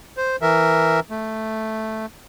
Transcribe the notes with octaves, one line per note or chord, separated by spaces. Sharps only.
C5
E3 A#4 E5
A3